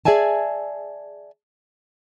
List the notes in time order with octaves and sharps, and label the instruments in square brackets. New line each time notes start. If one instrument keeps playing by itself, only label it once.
[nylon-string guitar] G#4 D5 E5 G#5 A5